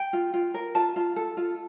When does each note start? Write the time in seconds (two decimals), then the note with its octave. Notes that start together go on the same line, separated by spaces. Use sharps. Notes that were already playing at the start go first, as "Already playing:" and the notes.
Already playing: G5
0.13 F4
0.34 F4
0.54 A#4
0.75 F4 A5
0.96 F4
1.16 A4
1.37 F4